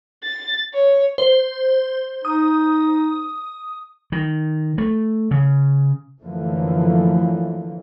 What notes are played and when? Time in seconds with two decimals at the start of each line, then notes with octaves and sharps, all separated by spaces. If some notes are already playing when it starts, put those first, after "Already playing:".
0.23 A6
0.73 C#5
1.18 C5
2.25 D#4 D#6
4.12 D#3
4.78 A3
5.31 C#3
6.21 F#2 D3 E3 F3 A3 A#3